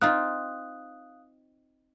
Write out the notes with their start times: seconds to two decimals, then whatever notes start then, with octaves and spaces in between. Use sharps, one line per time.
0.01 C4 D#4 F4 F5 D#6 F#6